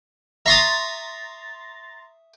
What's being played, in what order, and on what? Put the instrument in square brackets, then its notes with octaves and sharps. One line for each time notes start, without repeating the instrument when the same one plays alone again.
[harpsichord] E5 C#6 D#6 [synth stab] A#5 C6 A6